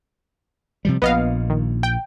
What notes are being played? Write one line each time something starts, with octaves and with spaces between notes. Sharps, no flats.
C3 F3 G3
A#1 A#2 B3 D#5 F5
D#3
G5